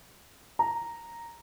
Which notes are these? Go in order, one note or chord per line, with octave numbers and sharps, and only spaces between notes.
A#5